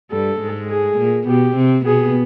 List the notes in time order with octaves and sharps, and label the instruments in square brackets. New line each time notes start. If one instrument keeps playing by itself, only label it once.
[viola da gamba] G2 G3 [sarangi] A4
[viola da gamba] G#2 G#3
[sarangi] G#4
[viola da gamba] A#2 A#3
[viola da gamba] B2 B3 [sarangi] G4
[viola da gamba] C3 C4
[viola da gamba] B2 B3 [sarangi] G#4